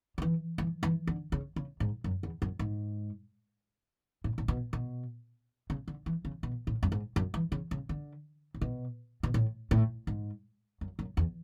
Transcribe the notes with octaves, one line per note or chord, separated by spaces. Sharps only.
D3
E3
E3
E3
D3
C#3
C#3
G#2
F#2
E2
F#2
G#2
A2
A2
B2
B2
C#3
D3
E3
C#3
B2
A2
F#2
G#2
F#2
E3
C#3
C#3
D3
A2
B2
B2
A2
A2
G#2
F#2
F#2
E2